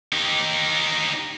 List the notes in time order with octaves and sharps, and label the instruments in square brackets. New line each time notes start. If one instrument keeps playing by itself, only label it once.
[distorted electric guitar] D#4 G4